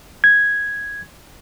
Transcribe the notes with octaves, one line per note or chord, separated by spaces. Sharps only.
G#6